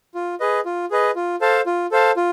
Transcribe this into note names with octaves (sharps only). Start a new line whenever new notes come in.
F4
G#4 B4 D#5
F4
G#4 B4 D#5
F4
A4 C5 F5 A5
F4
A4 C5 F5 A5
F4